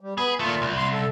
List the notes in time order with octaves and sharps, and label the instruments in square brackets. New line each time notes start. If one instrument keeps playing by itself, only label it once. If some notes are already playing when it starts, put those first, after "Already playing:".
[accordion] G3
[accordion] B3 B5 [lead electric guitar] G#4
[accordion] A#2 F4 [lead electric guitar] D#3 A3
[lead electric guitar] C2
[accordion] C6
A4